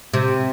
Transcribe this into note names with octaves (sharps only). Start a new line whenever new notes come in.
C3